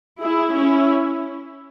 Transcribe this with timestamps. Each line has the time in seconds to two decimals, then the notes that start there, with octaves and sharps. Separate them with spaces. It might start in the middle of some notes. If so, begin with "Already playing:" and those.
0.20 E4 G#4
0.54 C#4 E4